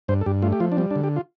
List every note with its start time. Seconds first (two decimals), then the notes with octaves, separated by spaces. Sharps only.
0.08 G2 C5
0.21 A4
0.26 G2 G4
0.42 A3 F4
0.52 G4
0.60 F3 F4
0.72 D4
0.77 G3 C4
0.91 D4
0.95 D3
1.04 G4
1.16 F4